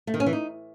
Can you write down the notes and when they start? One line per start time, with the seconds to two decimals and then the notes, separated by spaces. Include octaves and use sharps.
0.07 A3
0.14 D#3
0.20 C#4
0.26 E3
0.33 D#4